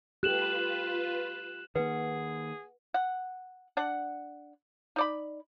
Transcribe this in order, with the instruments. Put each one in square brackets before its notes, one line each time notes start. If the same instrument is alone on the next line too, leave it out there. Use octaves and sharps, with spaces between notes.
[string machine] F4 B4 [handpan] G4 A4 [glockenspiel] F#6 E7 F#7
[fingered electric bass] D#3 A#3 [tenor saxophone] G#4 [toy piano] B4 [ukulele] F#5
[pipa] F#5
D4 F#5
D#4 D5 B5